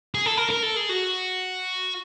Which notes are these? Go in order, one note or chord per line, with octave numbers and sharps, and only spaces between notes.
G#4
A4
A#4
A#4
A4
G#4
F#4